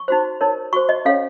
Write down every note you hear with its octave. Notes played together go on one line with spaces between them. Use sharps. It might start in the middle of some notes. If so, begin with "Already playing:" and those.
Already playing: C#6
D#4 F#4 C5
D#4 A#4 C#5
F#4 C5 C#6
D#5
C#4 A4 C#5 F5